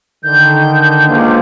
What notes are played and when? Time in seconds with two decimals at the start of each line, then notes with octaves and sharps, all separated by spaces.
0.24 D3 D#3 G6
1.07 C#2 A#3 C5